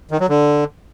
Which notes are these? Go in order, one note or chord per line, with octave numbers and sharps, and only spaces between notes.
D#3
F#3
D3